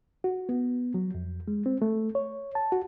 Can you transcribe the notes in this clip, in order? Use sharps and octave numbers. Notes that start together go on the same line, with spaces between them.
F#4
B3
F#3
F2
G#3
C4
A3
C#5
A5
F#4